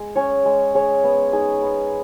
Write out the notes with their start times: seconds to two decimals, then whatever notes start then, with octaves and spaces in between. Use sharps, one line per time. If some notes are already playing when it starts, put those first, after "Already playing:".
Already playing: G#3
0.16 C#4 G#4 C#5
0.45 G#3
0.75 C#4 G#4 C#5
1.04 B3
1.33 D#4 G#4
1.62 B3